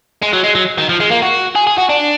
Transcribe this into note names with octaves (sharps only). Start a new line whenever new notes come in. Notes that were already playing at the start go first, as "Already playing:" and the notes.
G#3
F#3
G#3
F#3
D#3
F3
G#3
A#3
F#4
G#4
G#4
F#4
D4